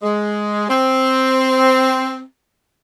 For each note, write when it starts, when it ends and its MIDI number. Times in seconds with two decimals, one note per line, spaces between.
0.03 0.68 56
0.69 2.22 60